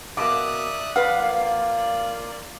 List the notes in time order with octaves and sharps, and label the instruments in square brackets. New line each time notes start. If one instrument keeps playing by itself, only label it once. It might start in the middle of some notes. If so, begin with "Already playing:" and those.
[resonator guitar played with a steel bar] B2 A#3 [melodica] D5 [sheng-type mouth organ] E5 D#6 F#6 [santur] D6
[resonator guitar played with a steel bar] F2 B4 F#5 [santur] F5
[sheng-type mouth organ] A#3 F4